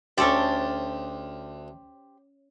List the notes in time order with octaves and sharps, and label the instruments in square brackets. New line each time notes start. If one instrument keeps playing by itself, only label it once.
[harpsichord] D2 [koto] C#4 A4 D5 [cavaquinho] G4 C5